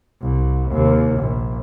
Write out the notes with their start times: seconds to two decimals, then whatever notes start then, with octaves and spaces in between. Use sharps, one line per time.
0.22 C2
0.71 D#2 C3
1.19 A#1